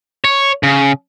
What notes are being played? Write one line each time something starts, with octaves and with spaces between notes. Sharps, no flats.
C#5
C#3